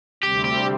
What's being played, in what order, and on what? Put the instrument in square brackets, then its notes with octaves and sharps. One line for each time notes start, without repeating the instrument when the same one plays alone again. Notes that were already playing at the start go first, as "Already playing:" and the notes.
[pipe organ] D2 C3 G3 C4 [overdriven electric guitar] G4
[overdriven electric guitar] G4